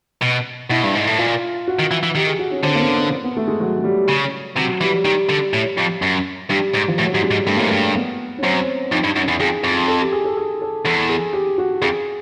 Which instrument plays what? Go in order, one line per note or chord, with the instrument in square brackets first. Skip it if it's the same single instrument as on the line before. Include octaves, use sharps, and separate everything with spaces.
[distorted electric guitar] B2
[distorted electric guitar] B2 [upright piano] E4
[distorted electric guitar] G2
G#2
A2
[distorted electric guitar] A#2 [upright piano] F4
[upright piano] F#4
[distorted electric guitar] D#3
E3
E3
[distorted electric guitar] D#3 [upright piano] G4
[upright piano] G#4
F#4
C#4
[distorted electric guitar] D3 [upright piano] C4
[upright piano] A#3
B3
B3
B3
A3
G#3
F#3
G#3
G3
[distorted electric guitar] C#3
[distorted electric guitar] C3 [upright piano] F#3
[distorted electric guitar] E3 [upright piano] G3
[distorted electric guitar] D#3 [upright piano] G3
[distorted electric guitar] D3
A2
F2
F#2
[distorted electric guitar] G2 [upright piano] G3
[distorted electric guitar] G#2
[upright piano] F3
[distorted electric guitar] A2 [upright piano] F#3
[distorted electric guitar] G#2 [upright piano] G3
[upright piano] G#3
[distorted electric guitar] G#2
[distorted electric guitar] G2 [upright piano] A3
[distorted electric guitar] G#2 [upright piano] A#3
[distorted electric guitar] G2 [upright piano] A3
[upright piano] B3
C#4
[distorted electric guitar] F#2 [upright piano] C4
[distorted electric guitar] F2 [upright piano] D#4
[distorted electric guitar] G2
F#2
E2
[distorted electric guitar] F2 [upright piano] G#4
[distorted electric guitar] F2
[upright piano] A4
G4
G#4
A4
G#4
A4
[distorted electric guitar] E2 [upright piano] A4
[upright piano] G#4
G4
F#4
[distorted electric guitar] F2 [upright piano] G#4